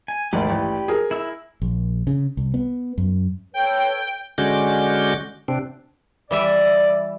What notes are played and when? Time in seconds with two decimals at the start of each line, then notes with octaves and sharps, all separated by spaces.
0.08 G#5
0.33 G#1 D2 G4 B4 D5
0.50 A1
0.88 G#4 A#4
1.11 E4 E6
1.62 A#1
2.07 C#3
2.37 C2
2.54 B3
2.98 F#2
3.54 A4 B4 C#5 G5
4.38 D3 G#3 C#4 F#4 D6 G6
5.48 C3 C4 D4
6.31 E3 G3 D5 E5